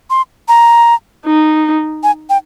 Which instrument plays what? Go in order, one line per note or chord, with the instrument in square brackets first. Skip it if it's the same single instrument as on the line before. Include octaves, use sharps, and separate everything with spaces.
[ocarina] C6
A#5
[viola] D#4
[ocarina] G#5
G5